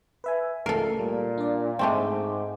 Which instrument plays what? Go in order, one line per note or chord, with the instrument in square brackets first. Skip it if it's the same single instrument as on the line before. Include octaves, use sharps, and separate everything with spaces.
[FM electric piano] B4 E5 G#5
[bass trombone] C#2 [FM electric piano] A3 C7 [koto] A4 A#4
[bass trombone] A#2 [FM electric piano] G3
[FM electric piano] D4 D5
[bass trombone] G#2 [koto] G#3 A3 C4 [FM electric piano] G5 D6